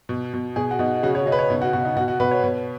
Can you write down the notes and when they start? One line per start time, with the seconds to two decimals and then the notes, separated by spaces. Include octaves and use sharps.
0.09 B2
0.34 B2
0.56 B2 G#4
0.71 F#4
0.79 B2 D#4
1.03 C#3 F#4
1.15 C#5
1.26 C#3 D#5
1.32 B4
1.39 C#5
1.50 B2 D#4
1.61 F#4
1.73 B2 F#4
1.85 D#4
1.96 B2 F#4
2.08 F#4
2.20 B2 B4
2.31 C#5
2.44 B2